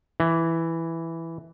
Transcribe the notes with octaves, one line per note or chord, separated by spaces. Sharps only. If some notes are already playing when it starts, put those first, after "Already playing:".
E3